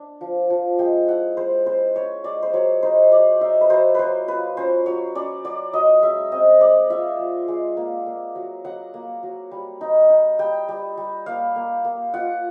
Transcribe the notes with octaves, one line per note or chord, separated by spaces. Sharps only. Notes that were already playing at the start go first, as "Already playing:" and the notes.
Already playing: D4
F3
F3
G#3 G5
E4 F#5
G#3 C5
C#4 C5
C#4 C#5
G#3 D5
C5
F#3 C#5
D#4 C5
F#3 D5
D#4 E5
B4
F#3 C5
F#3 B4 C5
F4 B4
C#4 C5
F#3 C#5
C#4 D5
F#3 D5
F#3 D#5
G#3 E5
C4 D#5
G#3 D5
F4 E5
G#3
G#3
A#3
A#3
F#3
F#3 F#5
A#3
F#3
G3
D#4
D#4
G3 G5
G3
G3
A#3 F5
A#3
A#3
F4 F#5